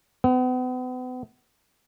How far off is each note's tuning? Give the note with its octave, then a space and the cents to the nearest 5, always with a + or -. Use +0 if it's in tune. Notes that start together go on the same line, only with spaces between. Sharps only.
B3 +40